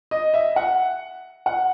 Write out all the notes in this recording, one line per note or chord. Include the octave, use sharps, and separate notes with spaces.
D#5
E5
F#5
F#5